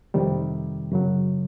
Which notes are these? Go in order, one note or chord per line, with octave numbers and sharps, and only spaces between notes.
F2 C3 D#3 G3
F#2 C#3 F#3